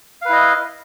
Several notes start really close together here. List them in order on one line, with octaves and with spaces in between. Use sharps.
F5 B4 E4 D#5